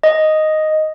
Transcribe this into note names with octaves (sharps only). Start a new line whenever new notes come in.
D#5